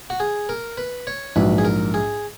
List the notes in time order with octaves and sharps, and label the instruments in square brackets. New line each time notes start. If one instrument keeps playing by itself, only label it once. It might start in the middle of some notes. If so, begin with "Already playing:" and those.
[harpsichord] F#4
G#4
A#4
B4
C#5
[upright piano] A#1 G#2 F#3 [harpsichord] B4
[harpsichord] G#4
A#4
G#4